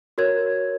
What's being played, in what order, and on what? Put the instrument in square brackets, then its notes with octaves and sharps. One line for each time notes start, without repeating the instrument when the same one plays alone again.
[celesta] F#4 A#4 C#5 G#6